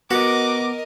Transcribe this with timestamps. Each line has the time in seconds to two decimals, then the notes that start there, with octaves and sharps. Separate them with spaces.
0.11 B3 F#4 A#4 D#5 D6